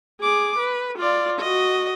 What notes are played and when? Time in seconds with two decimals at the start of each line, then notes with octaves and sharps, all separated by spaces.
0.21 G#4 D6
0.59 B4
0.99 F4 D5
1.39 F#4 D#5